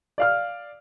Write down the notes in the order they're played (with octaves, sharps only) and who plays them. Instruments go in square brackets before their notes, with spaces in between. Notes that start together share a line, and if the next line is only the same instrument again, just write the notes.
[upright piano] D5 F5 F6